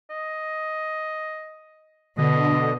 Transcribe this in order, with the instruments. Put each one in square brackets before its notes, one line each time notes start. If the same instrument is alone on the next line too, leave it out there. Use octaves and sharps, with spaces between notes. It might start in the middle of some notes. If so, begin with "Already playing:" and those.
[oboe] D#5
[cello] B2 [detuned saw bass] D3 [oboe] D#5